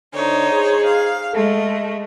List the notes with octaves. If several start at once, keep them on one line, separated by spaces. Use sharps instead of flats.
D3 D#4 C5 C#5
G#4
F5
G#3 A3 A4